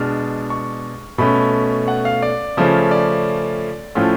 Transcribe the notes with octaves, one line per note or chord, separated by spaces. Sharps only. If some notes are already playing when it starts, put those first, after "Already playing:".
Already playing: B2 G#3 D4 F6
C#6
B2 A3 C#4 B5
F#5
F5
D5
C#3 F3 A3 C#4
D5
A2 F3 A3 C#4 F4